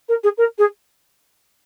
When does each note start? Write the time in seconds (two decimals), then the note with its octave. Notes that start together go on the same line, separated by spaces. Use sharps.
0.09 A#4
0.23 G#4
0.38 A#4
0.58 G#4